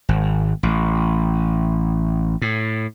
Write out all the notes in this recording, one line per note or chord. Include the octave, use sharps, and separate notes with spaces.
G#1
A1
A2